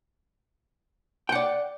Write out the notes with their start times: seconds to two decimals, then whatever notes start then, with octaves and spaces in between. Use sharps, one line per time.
1.29 G5
1.32 F#5
1.35 D5